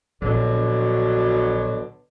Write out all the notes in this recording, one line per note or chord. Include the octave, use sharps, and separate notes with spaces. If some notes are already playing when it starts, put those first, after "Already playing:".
A#1 B2 D3 F#3 D4